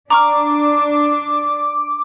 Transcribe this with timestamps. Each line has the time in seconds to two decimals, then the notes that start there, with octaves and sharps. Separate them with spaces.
0.10 D4 A#5 C#6 D6 F6